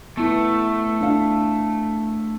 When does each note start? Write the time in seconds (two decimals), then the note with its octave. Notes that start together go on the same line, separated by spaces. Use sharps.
0.17 A3 B3 E4
1.01 D4 F5